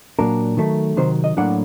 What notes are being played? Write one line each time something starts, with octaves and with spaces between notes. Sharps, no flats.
A#2 F#3 A#3 D4 A#4
D#3 F#3 A3
C3 D#3 F#3 C5
D#5
A2 F#3 A#3 D4 F#5